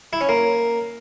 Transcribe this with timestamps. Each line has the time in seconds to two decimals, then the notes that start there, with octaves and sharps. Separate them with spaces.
0.13 E4
0.21 C#4
0.29 A#3